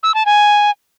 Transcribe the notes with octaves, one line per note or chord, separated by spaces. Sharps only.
E6
A5
G#5